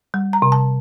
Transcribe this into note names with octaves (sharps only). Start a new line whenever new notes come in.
G3
A#5
C3
A5